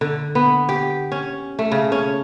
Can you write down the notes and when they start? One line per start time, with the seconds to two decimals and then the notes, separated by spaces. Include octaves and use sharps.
0.01 D3
0.35 B3
0.69 G4
1.12 C#4
1.59 A3
1.72 C#3
1.92 C#4